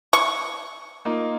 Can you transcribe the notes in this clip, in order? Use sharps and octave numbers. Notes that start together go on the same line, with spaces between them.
C#6
A#3 D#4 F4